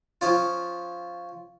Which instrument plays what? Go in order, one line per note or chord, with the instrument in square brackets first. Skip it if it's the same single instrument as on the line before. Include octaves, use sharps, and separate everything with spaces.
[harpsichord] F3 C#4 F4